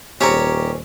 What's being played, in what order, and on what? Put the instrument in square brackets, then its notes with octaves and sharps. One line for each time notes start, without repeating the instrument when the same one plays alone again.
[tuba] D#1 [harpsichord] C4 C#4 [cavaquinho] G4 C#5 A#5